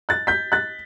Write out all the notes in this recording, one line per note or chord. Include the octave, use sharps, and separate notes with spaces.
F#6 A6
G6 B6
F#6 A6